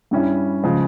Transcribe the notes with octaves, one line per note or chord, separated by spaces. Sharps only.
G2 G3 C#4 E4
C#3 F3 G#3